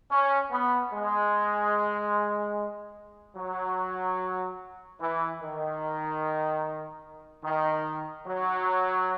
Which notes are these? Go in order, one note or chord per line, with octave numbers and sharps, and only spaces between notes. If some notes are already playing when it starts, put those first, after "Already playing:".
C#4
B3
G#3
F#3
E3
D#3
D#3
F#3